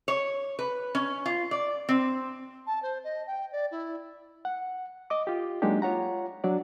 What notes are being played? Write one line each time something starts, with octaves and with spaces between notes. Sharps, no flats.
C#5
B4
C#4
F4
D5
C4
A5
C5
D#5
G5
D5
E4
F#5
D#5 D6
F4 G4
F#3 G#3 A#3 D4 D#4 G4
F4 C#5 F#5 A#5
F#3 D4 D5